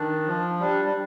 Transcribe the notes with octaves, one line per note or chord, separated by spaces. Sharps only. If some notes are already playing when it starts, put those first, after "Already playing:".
Already playing: D#3 D4
F3
G3 D4
G3